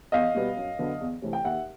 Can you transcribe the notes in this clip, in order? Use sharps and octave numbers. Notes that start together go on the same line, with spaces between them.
E2 D#5 F5
B2 G3 B3
F#2
D3 F#3 B3 D4
E2
C3 E3 A3 C4
G5
D#2 E5 F#5